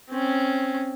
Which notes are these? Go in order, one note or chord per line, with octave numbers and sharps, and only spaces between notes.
C4 C#4